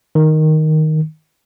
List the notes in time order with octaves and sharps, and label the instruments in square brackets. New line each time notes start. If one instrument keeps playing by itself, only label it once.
[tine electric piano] D#3